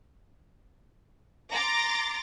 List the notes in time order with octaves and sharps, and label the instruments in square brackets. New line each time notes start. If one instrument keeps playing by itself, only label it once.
[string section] A#5 C6 D6 A6